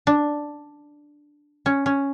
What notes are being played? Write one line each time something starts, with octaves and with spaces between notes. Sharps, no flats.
D4
C#4
C#4